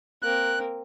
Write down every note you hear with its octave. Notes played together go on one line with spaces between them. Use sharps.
A#3 C4 F#6